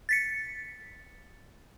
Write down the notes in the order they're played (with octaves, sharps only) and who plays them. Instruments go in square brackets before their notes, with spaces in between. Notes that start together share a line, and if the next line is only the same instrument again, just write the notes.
[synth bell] A6 B6 C#7